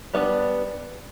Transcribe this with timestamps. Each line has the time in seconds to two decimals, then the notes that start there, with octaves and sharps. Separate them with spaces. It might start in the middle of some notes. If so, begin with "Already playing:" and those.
0.14 G3 B3 D4